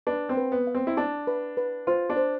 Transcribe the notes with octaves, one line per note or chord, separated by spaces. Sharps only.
D4 B4
C4
B4
B3
F5
C4
E4
D4 A5
B4
B4
F4 C5
D4
C5